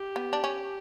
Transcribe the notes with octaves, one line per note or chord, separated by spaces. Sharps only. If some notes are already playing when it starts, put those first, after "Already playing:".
Already playing: G4
B3
D4
C#4